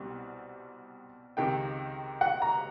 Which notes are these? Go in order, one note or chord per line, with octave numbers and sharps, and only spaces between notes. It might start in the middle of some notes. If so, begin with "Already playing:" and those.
Already playing: C2 B2 G3 C4
C#2 C3 D#3 G5
F#5
A#5